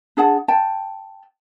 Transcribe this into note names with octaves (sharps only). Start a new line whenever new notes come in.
D4 G#4 F#5 A5
G5 A5